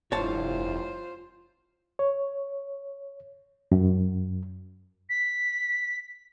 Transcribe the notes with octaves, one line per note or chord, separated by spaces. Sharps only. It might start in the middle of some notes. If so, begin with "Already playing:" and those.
F1 G2 E4 F4 C5 C#5 A5
C#5
F#2
B6